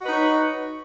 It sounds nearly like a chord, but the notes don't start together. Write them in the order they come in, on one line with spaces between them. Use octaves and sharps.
F#4 D#5 B4 D#4 C#5